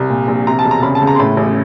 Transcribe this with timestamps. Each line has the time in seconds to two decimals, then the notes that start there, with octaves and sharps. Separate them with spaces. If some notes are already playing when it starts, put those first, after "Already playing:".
Already playing: C2
0.09 A#2
0.28 A#1
0.47 C3 A#5
0.59 A5
0.65 E1
0.71 A#5
0.82 C#3 B5
0.95 A5
1.01 C#2
1.07 A#5
1.15 C6
1.19 A2 B5
1.37 A1